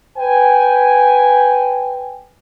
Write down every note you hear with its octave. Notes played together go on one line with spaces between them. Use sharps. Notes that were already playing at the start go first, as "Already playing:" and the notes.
B4 G5 G#5